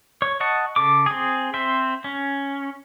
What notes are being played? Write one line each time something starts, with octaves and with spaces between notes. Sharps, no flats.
C#5
D#5 F#5 A5 C#6
C#3 A4 D6
C4 G#4
C4 C5 E5
C#4